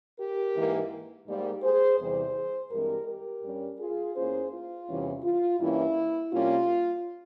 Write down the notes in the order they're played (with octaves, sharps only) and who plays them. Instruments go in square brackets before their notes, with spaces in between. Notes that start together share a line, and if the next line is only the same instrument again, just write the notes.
[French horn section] G4 A#4
G#2 E3 A#3
G#2 G3 A#3
G#4 C5
E2 C3 E3 G3 G#4 C5
G2 E3 G#3 C4 G4 A#4
G4 A#4
G2 G3 C#4
F4 G#4
E2 E3 A#3 C#4 G#4 C5
F4
E2 C3 E3 G3 C#4
F4
G2 E3 A#3 C#4 E4
C3 G3 A#3 C#4 F4